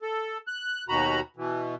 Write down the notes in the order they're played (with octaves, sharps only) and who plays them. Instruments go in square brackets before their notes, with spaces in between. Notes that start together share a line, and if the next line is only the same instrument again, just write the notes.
[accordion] A4
F#6
D#2 B2 D#3 F#4 A#5 B5
B2 E3